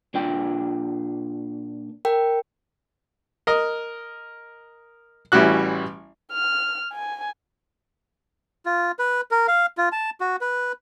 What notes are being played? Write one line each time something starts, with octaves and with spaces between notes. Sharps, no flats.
A#2 D4 G5
A#4 G5
A#4 D#5
A1 E3 G3 C#4 F#4 F#6
F6
G#5
F4
B4
A#4
F5
F4
A5
F#4
B4